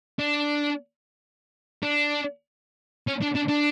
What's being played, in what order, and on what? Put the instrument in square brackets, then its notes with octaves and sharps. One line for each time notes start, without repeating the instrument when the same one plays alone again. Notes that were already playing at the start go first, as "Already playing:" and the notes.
[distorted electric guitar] D4
D4
C#4
D4
D4
D4